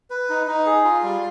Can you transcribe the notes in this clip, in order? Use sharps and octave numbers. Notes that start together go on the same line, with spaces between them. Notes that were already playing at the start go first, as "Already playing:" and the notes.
B4
D#4
D#4
G#4
F4
G3